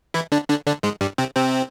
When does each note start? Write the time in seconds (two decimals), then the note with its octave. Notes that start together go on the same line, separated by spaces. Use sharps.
0.14 E3 E4
0.32 D3 D4
0.49 D3 D4
0.66 D3 D4
0.83 G#2 G#3
1.01 G2 G3
1.18 C3 C4
1.36 C3 C4